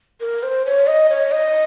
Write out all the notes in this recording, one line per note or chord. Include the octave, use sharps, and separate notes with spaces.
A#4
C5
C#5
D#5
C#5
D#5